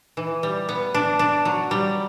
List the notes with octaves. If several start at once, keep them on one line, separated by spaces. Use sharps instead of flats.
E3
G3
B3
D4
D4
F#3
G3